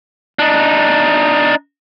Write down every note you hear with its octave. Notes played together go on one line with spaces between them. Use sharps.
D4 D#4